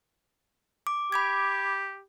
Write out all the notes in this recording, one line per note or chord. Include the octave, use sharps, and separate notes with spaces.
D6
G4 B5 D6 G#6